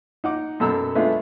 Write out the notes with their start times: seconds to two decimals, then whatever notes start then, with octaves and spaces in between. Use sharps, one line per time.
0.24 D#4 F#5 D6
0.60 F#2 B2 A4 A#5 E6
0.95 G#3 A3 B3 D4 E4 F4